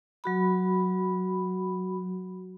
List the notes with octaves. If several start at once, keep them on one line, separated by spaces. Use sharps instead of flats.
F#3 F#4 B5